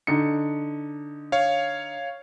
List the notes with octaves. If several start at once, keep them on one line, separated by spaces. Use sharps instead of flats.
D3 D#4 C#7
C#5 F5